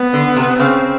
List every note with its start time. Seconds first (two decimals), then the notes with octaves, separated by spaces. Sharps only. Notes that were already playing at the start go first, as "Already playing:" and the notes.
Already playing: B3
0.13 D3
0.36 C3
0.59 C#3 C4